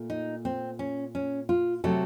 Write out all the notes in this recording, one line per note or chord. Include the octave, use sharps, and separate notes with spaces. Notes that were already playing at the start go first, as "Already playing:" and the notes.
Already playing: A#2 A3
D#4
C4
C#4
C#4
F4
C3 F#3 A3 A4